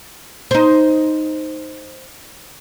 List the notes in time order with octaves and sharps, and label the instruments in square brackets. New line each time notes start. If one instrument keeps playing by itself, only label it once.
[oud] D#4 C5